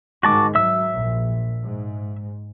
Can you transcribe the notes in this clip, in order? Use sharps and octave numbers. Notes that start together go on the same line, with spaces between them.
G#2 D#3 G#3 F#4 A5 D6
F#3 E5 E6
A#1
G#2